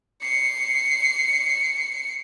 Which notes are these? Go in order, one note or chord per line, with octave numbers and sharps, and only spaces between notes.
C7 C#7